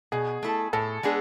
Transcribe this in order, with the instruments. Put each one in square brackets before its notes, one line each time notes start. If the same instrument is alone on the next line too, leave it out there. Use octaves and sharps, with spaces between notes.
[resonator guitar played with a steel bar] B2 [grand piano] G#4
[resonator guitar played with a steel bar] A3 E4 A4
[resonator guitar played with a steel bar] A2 [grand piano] A4
[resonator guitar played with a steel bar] G#3 B3 D4 G#4